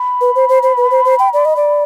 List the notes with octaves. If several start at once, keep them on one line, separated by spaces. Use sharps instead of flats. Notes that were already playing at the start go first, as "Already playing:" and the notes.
Already playing: B5
B4
C5
C5
C5
B4
C5
C5
G5
D5
D#5
D5